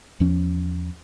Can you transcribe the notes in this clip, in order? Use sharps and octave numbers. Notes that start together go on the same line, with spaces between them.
E2 F3 C#4